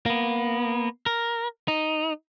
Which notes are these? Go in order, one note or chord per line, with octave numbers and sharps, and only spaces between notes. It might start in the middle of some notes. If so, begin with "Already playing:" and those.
A#3 B3
A#4
D#4